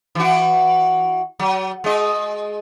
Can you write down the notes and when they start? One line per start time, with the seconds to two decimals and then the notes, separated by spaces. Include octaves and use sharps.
0.15 E3 F#4
1.39 F#3
1.84 G#3 D#5